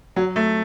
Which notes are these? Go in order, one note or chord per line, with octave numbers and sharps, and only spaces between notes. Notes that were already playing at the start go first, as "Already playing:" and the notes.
F#3
A3